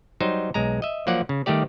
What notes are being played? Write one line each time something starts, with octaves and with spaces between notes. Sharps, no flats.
F#3 G3 D#4 C5
B1 G#3 A#5
D#5 E5
F3 F#3 A#3 D5 F#5
C#3
D#3 G3 A3 G4 D5